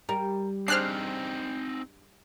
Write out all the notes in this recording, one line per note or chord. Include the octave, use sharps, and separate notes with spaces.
G3 A#4
C4 D4 D#4 G#4 C5 F6 F#6 C7